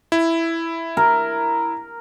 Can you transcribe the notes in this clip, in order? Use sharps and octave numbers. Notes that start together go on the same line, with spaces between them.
E4
A#4